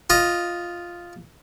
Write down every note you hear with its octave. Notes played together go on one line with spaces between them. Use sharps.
F4 D#5